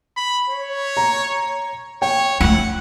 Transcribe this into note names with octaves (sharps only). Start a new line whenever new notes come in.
B5
C#5
A#5
C#5 G5
A3 F4 F#5